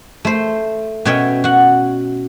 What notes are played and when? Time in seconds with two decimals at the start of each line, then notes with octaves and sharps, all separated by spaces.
0.25 A3 C5
1.05 B2 C#4 C#5 D#5 E5 G5
1.44 F#4 F#5